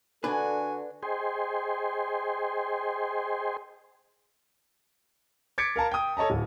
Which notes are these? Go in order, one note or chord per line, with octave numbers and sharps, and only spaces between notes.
D3 D4 F#4 A4 B4 G#5
G#4 C5 D#5 G5 G#5 C6
D6 G#6 A6 B6 C#7 D7
A#4 F5 A5 A#5
G5 D#6
A4 C#5 D#5 A5 A#5
D1